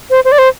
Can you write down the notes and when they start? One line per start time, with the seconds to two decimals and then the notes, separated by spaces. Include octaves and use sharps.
0.10 C5
0.25 C5
0.32 D5
0.38 C5